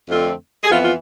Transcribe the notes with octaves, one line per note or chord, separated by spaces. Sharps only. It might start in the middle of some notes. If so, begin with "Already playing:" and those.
F2 D3 A3 C4 F4
G#4
F2 E3 B3 F4
F4